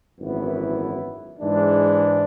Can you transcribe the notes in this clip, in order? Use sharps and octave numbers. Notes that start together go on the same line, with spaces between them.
G#1 F#2 E3 B3 E4
G#2 E3 G#3 D4